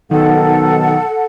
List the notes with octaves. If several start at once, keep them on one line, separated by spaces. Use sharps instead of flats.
B1 D#3 A4 F#5